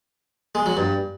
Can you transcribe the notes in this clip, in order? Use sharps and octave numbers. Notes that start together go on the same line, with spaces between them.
G#3
F#3
G2